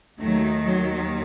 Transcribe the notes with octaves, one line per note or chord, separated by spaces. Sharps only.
D#2 D#3 F#3 A3
F#3